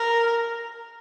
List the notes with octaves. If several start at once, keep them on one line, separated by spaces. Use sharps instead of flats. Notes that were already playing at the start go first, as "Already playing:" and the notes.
Already playing: A#4